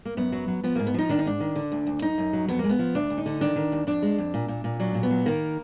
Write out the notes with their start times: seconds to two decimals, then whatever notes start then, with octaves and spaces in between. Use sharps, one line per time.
0.05 A#3
0.17 F#2 B3
0.32 F#3
0.48 F#3
0.64 F3 B3
0.75 G#2 A#3
0.87 B3
0.94 F3 D#4
1.09 D#3 D4
1.19 D#4
1.25 G#2 D4
1.40 D#3
1.56 D3
1.72 D2
1.87 D2
2.02 F#2 D#4
2.18 F#2
2.33 F#3
2.48 F2 B3
2.59 G#3 A#3
2.69 B3
2.79 F3
2.95 D2 D4
3.10 D2
3.18 D#4
3.26 D3
3.41 D#3 D4
3.56 D#3
3.72 D#2
3.87 F2 D4
4.02 G#3
4.18 F2
4.34 A#2
4.48 A#2
4.64 A#2
4.80 F#3 D4
4.95 A#2
5.03 B3
5.10 F#3
5.26 D#3 A#3